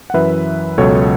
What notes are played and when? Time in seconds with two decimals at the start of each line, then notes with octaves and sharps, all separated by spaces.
0.10 F#5
0.14 F#2 E3 B4 E5
0.78 C#2 B2 F#3 A4 C#5